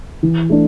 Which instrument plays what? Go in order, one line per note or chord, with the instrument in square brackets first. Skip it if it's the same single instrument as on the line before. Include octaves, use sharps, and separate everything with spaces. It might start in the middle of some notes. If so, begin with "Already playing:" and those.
[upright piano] E3
A3 D4